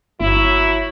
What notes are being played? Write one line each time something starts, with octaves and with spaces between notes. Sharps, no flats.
G1 F#3 E4